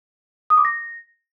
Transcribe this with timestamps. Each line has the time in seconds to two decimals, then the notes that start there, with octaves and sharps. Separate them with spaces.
0.50 D#6
0.57 D6
0.65 A#6